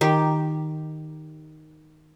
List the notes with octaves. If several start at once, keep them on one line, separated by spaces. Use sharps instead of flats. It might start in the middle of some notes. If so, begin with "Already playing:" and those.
D#3 G4